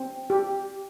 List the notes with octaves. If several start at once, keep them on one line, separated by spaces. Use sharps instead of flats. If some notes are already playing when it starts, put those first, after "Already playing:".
Already playing: C4
G4